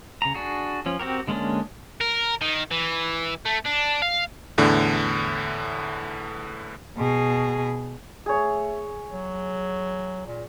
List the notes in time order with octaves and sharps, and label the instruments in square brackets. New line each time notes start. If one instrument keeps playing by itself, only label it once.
[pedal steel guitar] C#3 A#5
D4 F#4 G#4
F3 C#4
C4 F#4 G4 A#4
D3 G#3 A#3 C#4 D4
[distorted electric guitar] A#4
D#3
E3
A3
D4
F5
[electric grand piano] E2 A2 D3
[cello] B2 G#4
[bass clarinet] A3 [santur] G#4 C#5
[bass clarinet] F#3
A#2